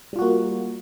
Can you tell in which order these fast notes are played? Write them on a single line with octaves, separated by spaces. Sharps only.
G3 F4 F#4 A#3